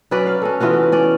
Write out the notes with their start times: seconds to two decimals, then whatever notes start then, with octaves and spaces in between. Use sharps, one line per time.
0.11 F#3 C#4 B4 D5
0.27 F5
0.42 C#4 F#4 A4
0.60 E3 B3 F4 F#4
0.73 C#4
0.92 C#4 D5